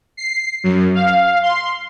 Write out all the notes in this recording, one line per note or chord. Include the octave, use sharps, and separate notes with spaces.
C7
F#2
F5
C6